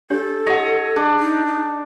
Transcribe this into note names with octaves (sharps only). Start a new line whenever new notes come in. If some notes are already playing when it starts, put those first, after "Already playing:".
D4 G4 A4 C#5
E4 G4 C#5 D#5 F#5
D4 G#4
D#4
D#4